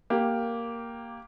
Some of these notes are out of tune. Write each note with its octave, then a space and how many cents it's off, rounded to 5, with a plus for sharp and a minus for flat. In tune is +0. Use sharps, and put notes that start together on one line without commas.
A#3 +0 G4 +0